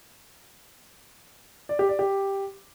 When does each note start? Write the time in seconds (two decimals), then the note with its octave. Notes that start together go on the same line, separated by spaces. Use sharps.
1.69 D5
1.79 G4
1.89 D5
1.99 G4